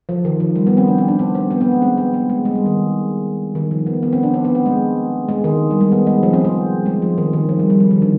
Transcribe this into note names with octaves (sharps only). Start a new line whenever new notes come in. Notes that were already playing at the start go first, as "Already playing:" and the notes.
F3
D#3
F3
G3
B3
C4
D4
C4
D4
C4
C4
B3
B3
G#3
C4
B3
B3
G#3
G#3
G3
D#3
D#3
F3
B3
B3
C4
D4
C4
B3
C4
G#3
G#3
D#3
G3
G#3
B3
G#3
F3
C4
C4
G#3
F3
D#3
D#3
F3
G3
G3
F3
D#3
D3